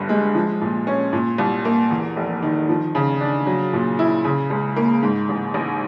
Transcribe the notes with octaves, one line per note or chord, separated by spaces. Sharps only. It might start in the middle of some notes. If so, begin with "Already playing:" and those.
Already playing: G1 G2
G#3
F3
A#2
C#4
A#2
C2
A#3
E2
F1
D#3
F3
C#3
D4
F#3
A#2
E4
C#3
C#2
A#3
G#2
A1
A1